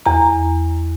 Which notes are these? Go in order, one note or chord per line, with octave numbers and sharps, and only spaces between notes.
E2 A#5